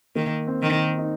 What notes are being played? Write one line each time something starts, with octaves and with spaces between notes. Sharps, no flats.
D#3 A#3
C4
D#3
D#4